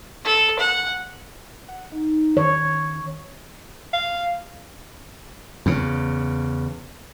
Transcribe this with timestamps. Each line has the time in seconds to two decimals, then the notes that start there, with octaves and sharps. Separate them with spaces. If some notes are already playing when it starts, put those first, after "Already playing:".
0.25 A4
0.59 F#5
1.68 F#5
1.92 D#4
2.37 D#3 C#5
3.93 F5
5.66 E2 C#3